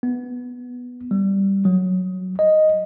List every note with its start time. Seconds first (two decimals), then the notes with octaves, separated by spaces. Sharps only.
0.03 B3
1.11 G3
1.65 F#3
2.39 D#5